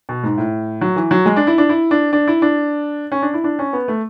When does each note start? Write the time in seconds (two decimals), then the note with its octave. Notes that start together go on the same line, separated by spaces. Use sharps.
0.09 B2
0.23 G#2
0.38 A2
0.81 F#3
0.96 E3
1.11 F#3
1.25 G#3
1.36 D4
1.47 E4
1.58 D4
1.69 E4
1.91 D4
2.13 D4
2.28 E4
2.42 D4
3.12 C#4
3.22 D4
3.34 E4
3.44 D4
3.59 C#4
3.73 B3
3.88 A3